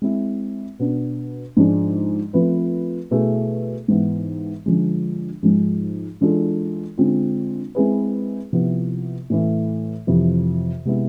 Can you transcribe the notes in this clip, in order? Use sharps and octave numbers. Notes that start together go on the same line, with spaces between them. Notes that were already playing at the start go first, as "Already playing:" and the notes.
G#3 C4 E4
B2 B3 D4
G#2 F3 G#3 D4
F3 A3 C4 F4 B4
B2 A3 E4 G#4
G#2 E3 B3 E4
D3 F3 G#3
G#2 F3 G#3
E3 G#3 D4 F4 A4
D3 G#3 C4 F4
G#3 C4 E4 G#4 B4
C3 F3 B3 E4
A2 E3 A3
F2 C3 E3
C3 G#3 B3 E4